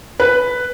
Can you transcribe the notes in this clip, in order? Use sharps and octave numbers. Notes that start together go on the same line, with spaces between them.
B4